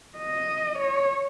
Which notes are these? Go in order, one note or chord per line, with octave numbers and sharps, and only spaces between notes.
D#5
C#5